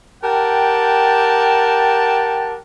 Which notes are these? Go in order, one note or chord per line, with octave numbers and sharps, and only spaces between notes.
G4 A#4 F#5 G5 A5